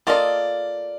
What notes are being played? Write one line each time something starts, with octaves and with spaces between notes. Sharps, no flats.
A#3 F4 A4 D5 D#5